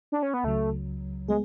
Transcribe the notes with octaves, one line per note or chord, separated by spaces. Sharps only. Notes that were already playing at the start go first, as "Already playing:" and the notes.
D4
C#4
B3
C#2 C#3 F#3 A3
G#3 B3 G#4